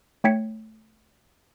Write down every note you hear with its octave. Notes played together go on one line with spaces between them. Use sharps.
A3 C#5 G5 G#6 B6 C#7